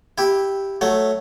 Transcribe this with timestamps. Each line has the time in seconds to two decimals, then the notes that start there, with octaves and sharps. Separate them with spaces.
0.18 E4 G4
0.81 F#3 A3